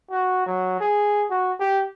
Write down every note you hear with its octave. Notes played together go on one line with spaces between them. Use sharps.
F#4
F#3
G#4
F#4
G4